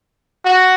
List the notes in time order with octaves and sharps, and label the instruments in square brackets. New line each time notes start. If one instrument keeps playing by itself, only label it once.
[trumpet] F#4